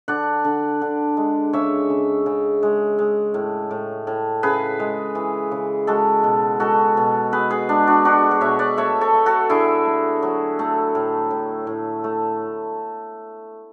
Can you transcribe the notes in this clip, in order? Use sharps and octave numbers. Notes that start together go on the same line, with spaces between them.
D3 D5 F#5
D3
D3
G#3
C#3 C#5 E5
C#3
C#3
G#3
G#3
A2
A2
A2
C#3 G#4 B4
G#3
E3
C#3
G#3 F#4 A4
B2
G#3 F#4 A4
B2
B2 G#4 B4
G#4 B4
G#3 D4
D4 F#4
G#3 D4 F#4
F#5
B2 C#5 E5
D5 F#5
A3 C#5 E5
A4 C#5
A3
F#4 A4
D3 E4 G#4
A3
F#3
A3
A2
A2
A2
A3